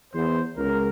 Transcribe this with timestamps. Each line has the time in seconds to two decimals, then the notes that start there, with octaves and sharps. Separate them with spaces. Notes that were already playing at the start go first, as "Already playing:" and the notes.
0.14 E2 C5
0.57 C#2 A#4